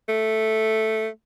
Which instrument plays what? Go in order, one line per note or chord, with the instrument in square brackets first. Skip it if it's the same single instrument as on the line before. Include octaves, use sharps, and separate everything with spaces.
[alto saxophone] A3